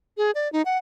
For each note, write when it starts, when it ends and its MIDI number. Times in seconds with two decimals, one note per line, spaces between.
0.17 0.31 68
0.35 0.51 74
0.52 0.62 63
0.65 0.77 78